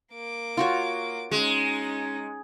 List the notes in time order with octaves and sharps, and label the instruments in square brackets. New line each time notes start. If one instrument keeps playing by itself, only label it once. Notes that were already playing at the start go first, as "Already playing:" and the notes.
[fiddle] A#3 D6
[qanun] F4 F#4 C#5
[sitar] G#3 [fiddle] C#4 D#4